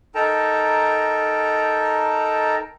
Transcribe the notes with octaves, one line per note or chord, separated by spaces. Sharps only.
D#4 A4 A#4 G5 A5 A#5